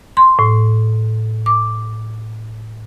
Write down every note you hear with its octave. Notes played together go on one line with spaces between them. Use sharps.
C6
A2
D6